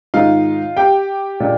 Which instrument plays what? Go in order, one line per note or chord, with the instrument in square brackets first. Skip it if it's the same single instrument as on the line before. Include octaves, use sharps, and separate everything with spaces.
[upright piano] G#2 D#3 G#3 D#4 F4 F5
G4 G5
A#2 G#3 D4